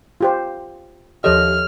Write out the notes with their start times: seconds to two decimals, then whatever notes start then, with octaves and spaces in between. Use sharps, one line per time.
0.21 F4 G4 C5
1.24 D#2 F3 G4 A4 C#5 D#5 E5 F6